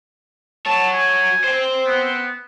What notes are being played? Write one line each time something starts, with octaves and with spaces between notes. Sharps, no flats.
F#4 C#5 A5
G#5
C5 G5
B3